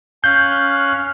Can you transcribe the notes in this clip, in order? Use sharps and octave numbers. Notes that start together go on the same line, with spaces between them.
C#4 F5 F#6 G6